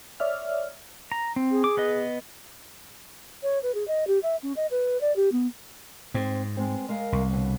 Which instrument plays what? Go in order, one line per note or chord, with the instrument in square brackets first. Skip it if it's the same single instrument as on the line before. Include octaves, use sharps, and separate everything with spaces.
[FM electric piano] C#5 D5 E5 F6
[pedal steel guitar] A#5
C4
[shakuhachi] G#4
[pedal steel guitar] D6
B3 B4 D#5
[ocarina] C#5
B4
G#4
D#5
G4
E5
C#4
D#5
B4
D5
G4
B3
[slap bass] G#2 [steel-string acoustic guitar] C4
[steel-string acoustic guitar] G#3 B3 C4
G#3 A#4 F5
[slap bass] C2
[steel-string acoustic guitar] D#2 B2 D3